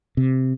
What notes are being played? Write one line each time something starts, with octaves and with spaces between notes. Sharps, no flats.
C3